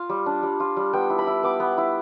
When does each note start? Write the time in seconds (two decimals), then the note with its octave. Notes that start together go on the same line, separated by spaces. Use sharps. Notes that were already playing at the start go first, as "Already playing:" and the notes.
Already playing: F4 F5
0.09 G3
0.26 D4
0.43 G3
0.60 F4
0.77 G3
0.93 B3 G5
1.10 E4
1.19 B5
1.27 E4
1.43 B3 D6
1.60 B3
1.78 E4